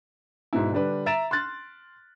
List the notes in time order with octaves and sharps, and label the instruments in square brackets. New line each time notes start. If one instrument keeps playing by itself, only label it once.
[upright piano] G#2 B2 E4
D3 G3 D4 B4
E5 A#5 A6 D7 E7
C6 F6 F#6 A6